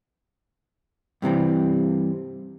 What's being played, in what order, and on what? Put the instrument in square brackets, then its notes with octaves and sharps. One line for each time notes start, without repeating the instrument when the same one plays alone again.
[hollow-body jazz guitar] G2 C3 E3 C4